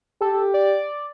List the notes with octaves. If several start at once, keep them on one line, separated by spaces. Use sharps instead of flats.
G4 A4
D5